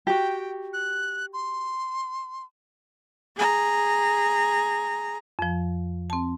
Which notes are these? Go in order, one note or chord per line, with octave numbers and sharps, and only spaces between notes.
F#4 G4 G5
F#6
C6
G#4 A#5
F2 F3
C4 A5